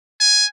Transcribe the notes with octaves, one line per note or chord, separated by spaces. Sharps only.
G#5